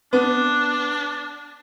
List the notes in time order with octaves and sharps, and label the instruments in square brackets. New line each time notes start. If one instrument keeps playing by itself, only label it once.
[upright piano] B3 [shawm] D4